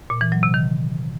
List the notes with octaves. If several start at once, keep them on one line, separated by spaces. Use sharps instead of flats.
A#2
E3
F#3
C3
D#3